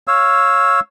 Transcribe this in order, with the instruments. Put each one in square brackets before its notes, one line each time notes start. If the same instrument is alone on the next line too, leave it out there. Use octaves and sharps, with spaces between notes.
[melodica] C#5 F5 E6